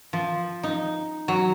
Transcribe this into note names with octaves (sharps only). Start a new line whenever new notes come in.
F3
D#4
F#3